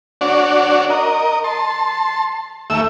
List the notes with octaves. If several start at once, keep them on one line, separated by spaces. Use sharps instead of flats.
D4 F#4 C#5 D5
A#4 D#5
A5 C6
D#2 A3 E5 E6